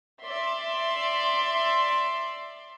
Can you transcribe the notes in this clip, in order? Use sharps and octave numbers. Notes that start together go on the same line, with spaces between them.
D5 E5 C6